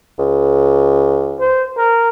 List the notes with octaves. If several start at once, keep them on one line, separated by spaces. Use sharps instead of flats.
C#2
C5
A#4